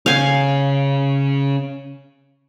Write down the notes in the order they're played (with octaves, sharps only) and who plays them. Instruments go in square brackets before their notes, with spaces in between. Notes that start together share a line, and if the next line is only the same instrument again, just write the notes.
[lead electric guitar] C#3 C#4 [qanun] F5 G#5